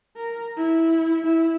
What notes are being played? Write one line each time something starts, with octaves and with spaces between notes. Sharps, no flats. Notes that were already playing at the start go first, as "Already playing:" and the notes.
A#4
E4
E4